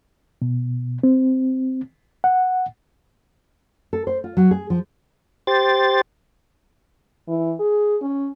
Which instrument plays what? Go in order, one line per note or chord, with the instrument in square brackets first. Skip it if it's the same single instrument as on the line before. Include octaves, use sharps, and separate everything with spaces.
[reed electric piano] B2
C4
F#5
[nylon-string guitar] A4
C5
F4
F#3
G#4
F3
[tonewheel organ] G4 C5 A6
[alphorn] E3
G#4
C#4